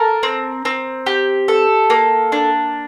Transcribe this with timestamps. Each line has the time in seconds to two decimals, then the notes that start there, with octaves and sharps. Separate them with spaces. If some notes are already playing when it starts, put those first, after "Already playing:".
Already playing: A4 A#4
0.23 C4
0.65 C4
1.06 G4
1.48 A4
1.90 A#3
2.32 D4